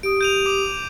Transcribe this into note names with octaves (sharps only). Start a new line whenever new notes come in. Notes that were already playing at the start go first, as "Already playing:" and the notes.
G4 D#6 D7
G6 D#7 F7
D6 F7